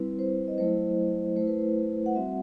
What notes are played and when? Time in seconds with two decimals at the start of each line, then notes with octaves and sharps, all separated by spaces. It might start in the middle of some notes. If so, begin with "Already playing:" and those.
Already playing: G3 C4 E4 B4
0.19 C5
0.48 D#5
0.58 F#3 A3 E4 C5
1.36 A3 E4 C5
1.47 B4
1.58 C5
2.06 F#5
2.15 G3 C4 F#4 E5